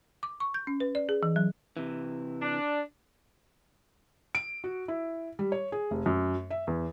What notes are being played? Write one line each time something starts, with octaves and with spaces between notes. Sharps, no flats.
D6
C#6
G6
C#4
B4
D5
G#4
E3
F#3
C3 E3
D4
D7
F#4
E4
G3
C#5
G#4
F1
F#2
E5
E2